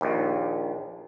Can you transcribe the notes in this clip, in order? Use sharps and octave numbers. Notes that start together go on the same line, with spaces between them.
A#1 D#2